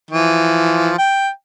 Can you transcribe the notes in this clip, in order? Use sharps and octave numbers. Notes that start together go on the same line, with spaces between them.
E3 F3
G5